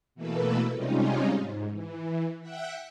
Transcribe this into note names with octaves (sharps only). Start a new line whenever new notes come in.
B2 E3 A3 A#3 A4 B4
C3 G3 G#3 C#4 D#4 F4
G#2
E3
E5 F#5 G5 F#6